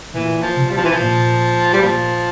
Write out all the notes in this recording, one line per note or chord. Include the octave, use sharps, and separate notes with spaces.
A#2 E3
F3
C3
G3
F3
E3
F3
A#2
G3
A#2 F3